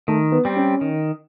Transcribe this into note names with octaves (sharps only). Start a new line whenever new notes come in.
D#3 A3
B3
G3 C4
C#4
D#3